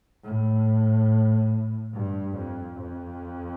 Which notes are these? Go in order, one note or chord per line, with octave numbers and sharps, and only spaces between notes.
A2
G2
F2
F2